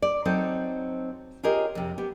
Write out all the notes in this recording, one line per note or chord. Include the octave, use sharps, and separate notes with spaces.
D5
F#3 C4 D#4 A4 C5
F4 G4 G#4 A#4 C#5 D#5
F2 C3
B3 G4